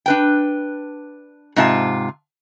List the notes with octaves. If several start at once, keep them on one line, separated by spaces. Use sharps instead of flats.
D4 B4 G5
G#2 C3 F4 A4 A5